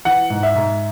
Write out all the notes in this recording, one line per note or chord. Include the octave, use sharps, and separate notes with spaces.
E3 F#5
G#2
E5
G#2